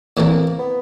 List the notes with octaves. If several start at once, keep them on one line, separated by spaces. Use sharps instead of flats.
A2 E3 A3 A#3 C4 E4
B3